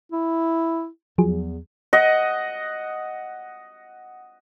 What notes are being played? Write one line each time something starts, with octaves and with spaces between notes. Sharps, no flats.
E4
E2 F3 F#3 G#4
D#5 F#5